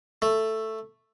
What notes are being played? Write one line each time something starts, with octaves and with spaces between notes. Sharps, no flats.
A3